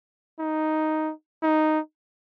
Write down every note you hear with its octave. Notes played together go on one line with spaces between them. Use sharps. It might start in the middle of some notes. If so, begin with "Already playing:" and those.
D#4
D#4